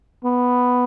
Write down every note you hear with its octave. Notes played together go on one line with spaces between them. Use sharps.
B3